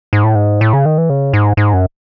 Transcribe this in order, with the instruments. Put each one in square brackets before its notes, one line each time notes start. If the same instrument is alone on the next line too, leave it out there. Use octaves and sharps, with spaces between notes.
[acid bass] G#2
A2
G#2
A2
C#3
D#3
E3
C#3
G#2
G#2
F#2